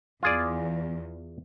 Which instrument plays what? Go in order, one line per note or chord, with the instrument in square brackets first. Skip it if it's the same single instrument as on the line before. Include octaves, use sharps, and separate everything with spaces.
[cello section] E2 [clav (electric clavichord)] F4 G#4 D5